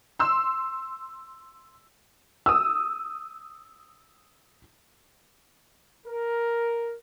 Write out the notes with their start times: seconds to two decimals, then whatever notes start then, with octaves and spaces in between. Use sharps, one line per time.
0.19 C6 E6
2.46 D#6 E6
6.07 A#4